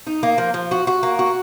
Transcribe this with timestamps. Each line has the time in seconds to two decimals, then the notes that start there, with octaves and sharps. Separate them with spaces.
0.07 D#4
0.23 A#3
0.38 F3
0.54 F3
0.71 F#4
0.87 F#4
1.03 A#3
1.19 F#4